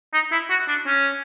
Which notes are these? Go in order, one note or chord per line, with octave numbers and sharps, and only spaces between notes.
D#4
E4
F#4
D4
C#4